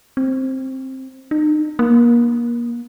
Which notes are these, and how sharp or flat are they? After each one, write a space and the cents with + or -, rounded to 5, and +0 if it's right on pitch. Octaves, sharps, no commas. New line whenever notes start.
C4 +10
D#4 -40
A#3 +30